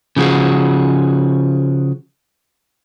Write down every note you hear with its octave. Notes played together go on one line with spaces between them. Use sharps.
C#3 F3 F#4 G#4